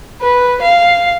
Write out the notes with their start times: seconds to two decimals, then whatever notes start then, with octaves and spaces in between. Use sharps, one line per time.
0.21 B4
0.62 F5